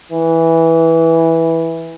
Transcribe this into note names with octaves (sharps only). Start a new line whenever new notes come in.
E3